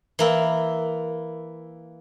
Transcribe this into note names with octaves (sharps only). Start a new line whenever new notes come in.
E3 A#3 E4